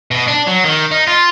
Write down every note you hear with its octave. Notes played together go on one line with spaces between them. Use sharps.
B2
D4
F#3
D#3
D#4
F4